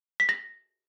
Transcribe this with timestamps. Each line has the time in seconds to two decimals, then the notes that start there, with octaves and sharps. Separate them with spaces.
0.20 B6
0.29 A#6